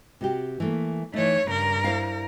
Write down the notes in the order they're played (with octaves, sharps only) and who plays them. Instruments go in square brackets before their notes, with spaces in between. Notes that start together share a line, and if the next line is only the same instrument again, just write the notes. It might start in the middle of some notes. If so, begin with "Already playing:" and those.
[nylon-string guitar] C3 F#4 G4
E3 A3 A#3
[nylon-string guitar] E3 D#4 [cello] A3 C#5
[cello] G2 A#4 [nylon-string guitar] C#3
[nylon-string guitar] E4 C5 F5